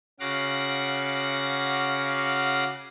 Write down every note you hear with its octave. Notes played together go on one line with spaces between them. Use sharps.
C#3 F#4 F5 F#5 D6 A#6